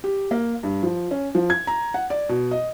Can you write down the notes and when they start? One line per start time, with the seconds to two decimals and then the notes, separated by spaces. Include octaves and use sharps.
0.04 G4
0.31 A#3
0.63 G2
0.83 F3
1.11 C#4
1.35 F3
1.50 G#6
1.67 A#5
1.94 F#5
2.10 D5
2.29 B2
2.51 D#5